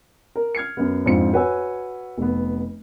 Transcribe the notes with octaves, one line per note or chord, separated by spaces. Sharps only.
A#4
F6 G#6 C7 C#7
F#2 B3
F2 G#2 C4 D4 F4 C#7
F#4 B4 C#5 F#5 G#5 E6
F1 B3